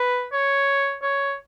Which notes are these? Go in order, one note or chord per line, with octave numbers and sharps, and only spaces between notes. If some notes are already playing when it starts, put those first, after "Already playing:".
Already playing: B4
C#5
C#5